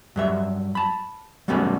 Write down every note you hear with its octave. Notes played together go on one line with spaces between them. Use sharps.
G2 F#3 E5
A5 B5
F#3 G3 A3 B3 C#4 F#4